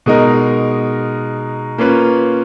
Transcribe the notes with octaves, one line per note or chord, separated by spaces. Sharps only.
B2 G#3 D#4 A#4
A#3 C#4 F4 B4